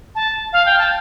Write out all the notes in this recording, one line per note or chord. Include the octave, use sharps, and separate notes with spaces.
A5
F5
G5
A5